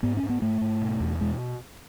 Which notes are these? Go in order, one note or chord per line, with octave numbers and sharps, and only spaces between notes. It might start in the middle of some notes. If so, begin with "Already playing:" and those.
G#2 B3
C#4
G#2
B3
G#2 A3
G#2
B2
E2
B2 G#3